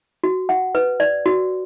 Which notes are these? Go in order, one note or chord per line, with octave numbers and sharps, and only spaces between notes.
F#4
F#5
B4
D5
F#4